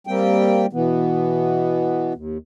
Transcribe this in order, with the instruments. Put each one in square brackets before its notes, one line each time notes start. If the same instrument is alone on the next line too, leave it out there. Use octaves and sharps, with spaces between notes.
[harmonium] G3 A#3 C4 G5
B2 E3 B3
D#2